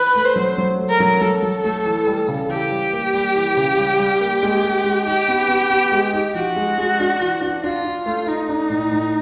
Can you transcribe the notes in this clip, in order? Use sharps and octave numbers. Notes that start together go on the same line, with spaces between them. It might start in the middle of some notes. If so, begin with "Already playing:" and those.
Already playing: B4
A3
C5
F#3
F#3
A3
A#4
F#3
F#3 A4
F#3
A3
E3
G3
C#3
E3 G4
G3
A#3
G3
E3
C#3
G3
G3
A#3
G#3
G#3
G#3
D#4 G4
B3
B3
B3
G#3
D#4
F3 F#4
G#3
G#3
D4
E3
D4
D4 F4
D4
A3
A3 D#4
D4
A2
A2